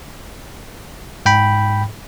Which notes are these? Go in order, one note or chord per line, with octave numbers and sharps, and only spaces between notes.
G#2 G5 B5